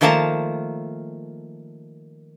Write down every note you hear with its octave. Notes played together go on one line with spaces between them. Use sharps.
D#3 F3 A3 A#3 A5 A#5